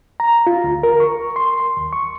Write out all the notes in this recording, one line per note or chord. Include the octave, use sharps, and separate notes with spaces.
A#5
F4
D2
A#4
C#6
C6
C6
D#2
C#6